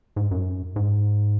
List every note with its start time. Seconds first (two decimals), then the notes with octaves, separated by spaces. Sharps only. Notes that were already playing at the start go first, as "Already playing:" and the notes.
0.16 G#2
0.31 F#2
0.76 G#2